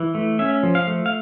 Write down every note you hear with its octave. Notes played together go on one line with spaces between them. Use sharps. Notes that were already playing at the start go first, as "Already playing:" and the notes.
Already playing: E3
A3
C#4 E5
F3
F5
A3
F5